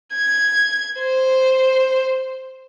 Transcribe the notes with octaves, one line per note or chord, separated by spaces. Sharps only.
G#6
C5